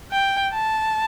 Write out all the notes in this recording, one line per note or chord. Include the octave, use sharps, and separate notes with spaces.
G5
A5